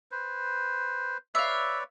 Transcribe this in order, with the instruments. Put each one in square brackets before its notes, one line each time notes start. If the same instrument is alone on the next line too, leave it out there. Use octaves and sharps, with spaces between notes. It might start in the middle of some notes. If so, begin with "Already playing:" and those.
[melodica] B4 C5
[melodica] B4 C#5 D5 [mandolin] E5 F5